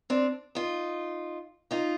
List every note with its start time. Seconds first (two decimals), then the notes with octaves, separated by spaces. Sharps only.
0.10 C4 D4
0.55 D#4 F4
1.71 D#4 F4